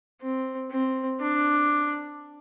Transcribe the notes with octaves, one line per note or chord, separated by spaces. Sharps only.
C4
C4
D4